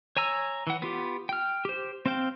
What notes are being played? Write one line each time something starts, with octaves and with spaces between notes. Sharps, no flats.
C#5 G#5 A#5 E6
E3 F#5
B3 F4 G4
G5 F6
G4 C5
C4 C5 F5 G5